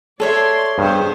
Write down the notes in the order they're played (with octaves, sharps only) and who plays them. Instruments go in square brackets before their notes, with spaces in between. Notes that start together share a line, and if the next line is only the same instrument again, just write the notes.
[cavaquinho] A4 C#5 E5 [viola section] D5 C6
[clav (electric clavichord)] G2 [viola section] B3 G#4 C5